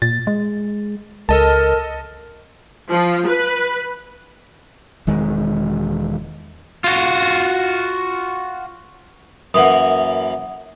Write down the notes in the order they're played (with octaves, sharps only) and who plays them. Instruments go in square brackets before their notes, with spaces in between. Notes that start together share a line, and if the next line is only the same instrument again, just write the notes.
[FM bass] A#2 [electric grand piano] A6
[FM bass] G#3
[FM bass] C#2 [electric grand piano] A4 D#5 A5 [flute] A#4
[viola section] F3
B4
[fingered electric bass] E1 D#3 G#3
[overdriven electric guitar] F4 F#4
[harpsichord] F#2 E3 A#3 [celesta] F#5 D#6